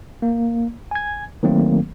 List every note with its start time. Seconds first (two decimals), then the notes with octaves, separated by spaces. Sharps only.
0.22 A#3
0.91 G#5 G#6
1.43 D#3 F#3 A3 A#3 C4